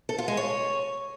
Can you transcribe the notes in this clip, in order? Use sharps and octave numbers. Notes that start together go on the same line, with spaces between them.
A4
F4
G#3
C#5